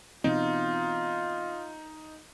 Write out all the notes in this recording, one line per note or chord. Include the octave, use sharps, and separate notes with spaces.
B2 E3 C4 D#4 F4